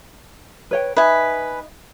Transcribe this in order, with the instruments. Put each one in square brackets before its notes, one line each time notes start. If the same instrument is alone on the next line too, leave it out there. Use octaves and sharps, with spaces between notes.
[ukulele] B4 C#5 G5
[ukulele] D#4 E5 [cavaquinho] B4 G#5